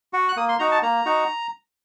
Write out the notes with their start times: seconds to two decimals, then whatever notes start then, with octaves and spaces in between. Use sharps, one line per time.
0.13 F#4
0.29 F#6
0.36 A#3 D#6
0.49 C6
0.59 D#4 F#4 A#5
0.72 A5
0.82 A#3 A#5
1.05 D#4 F#4